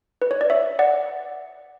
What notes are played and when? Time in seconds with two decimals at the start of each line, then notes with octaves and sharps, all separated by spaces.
0.22 B4
0.31 C#5
0.41 D5
0.50 C#5 E5
0.79 D5 F#5